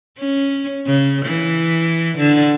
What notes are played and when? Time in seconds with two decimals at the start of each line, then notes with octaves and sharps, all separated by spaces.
0.18 C#4
0.86 C#3
1.26 E3
2.18 D3